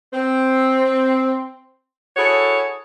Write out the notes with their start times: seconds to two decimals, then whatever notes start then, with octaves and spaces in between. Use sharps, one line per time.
0.13 C4
2.17 E4 F#4 G#4 A4 C#5